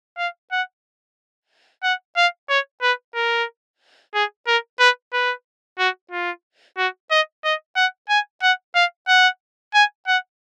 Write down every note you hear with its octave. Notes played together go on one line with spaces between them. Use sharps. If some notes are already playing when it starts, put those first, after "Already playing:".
F5
F#5
F#5
F5
C#5
B4
A#4
G#4
A#4
B4
B4
F#4
F4
F#4
D#5
D#5
F#5
G#5
F#5
F5
F#5
G#5
F#5